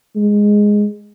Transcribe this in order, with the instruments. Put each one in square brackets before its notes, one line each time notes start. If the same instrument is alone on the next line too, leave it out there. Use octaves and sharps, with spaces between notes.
[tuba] G#3